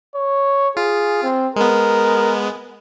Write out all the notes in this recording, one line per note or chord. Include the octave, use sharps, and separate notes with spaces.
C#5
F4 G#4
C4
G#3 B3 A#4